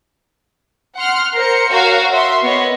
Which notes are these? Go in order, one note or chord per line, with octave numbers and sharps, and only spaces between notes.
F#5 C6 F6
A#4 C5 C#7
F#4 A#4 C#5 F5
E5 C6
B3 C#5 D#5